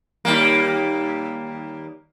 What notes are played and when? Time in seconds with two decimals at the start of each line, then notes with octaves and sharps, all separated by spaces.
0.25 D#2 G3 A#3